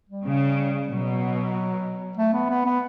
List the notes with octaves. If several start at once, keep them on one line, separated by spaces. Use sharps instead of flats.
G3
C#3
B2 F#3
A3
B3
B3
B3